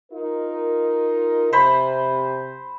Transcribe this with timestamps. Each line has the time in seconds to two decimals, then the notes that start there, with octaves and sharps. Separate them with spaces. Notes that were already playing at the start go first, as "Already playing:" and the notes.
0.11 D#4 F4 A#4
1.53 C3 C5 B5